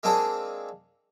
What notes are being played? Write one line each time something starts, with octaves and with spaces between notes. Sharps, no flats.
G#3 A#3 C4 D4 G#4 A4